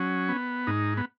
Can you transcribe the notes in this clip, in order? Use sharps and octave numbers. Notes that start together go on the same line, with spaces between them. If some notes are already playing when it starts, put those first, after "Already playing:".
Already playing: F#3 C#4
B3
G#2 D#4
B3